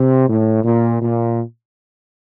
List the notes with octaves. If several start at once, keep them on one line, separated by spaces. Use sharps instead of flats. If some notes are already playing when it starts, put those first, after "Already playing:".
Already playing: C3
A2
A#2
A#2